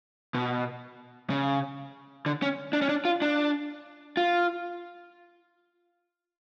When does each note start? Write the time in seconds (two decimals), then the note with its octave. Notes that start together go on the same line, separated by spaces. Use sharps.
0.35 B2
1.30 C#3
2.26 D3
2.42 C#4
2.73 D4
2.82 C#4
2.89 D4
3.05 F4
3.22 D4
4.17 F4